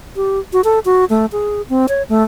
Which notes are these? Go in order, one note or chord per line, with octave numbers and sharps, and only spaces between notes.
G4
F#4
A4
F#4
A3
G#4
C4
C#5
A3